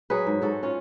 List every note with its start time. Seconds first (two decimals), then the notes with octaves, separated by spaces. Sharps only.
0.10 F#3 G#4 B4
0.26 G#2
0.42 G#2 F#4 A4
0.63 C#4 F4